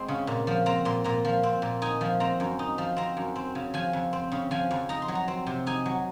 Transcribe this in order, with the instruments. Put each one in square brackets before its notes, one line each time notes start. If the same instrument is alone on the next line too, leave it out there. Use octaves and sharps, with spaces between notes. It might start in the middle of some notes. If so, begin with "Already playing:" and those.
Already playing: [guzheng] G#3 C4 C6
C#3
A#2
F3
C4 A#5
A#2 C6
A#2 A#5
F3
C4
A#2
D#4 G#5
F3
C4 A#5
F#2
D#4
F3
C4 A#5
F#2
C4
C#3
F3 G#5
F2
C4
C#3
F3 G#5
F2
D#4 A#5
C6
F#3
A#5
C4
C3
D#4 G#5
F#3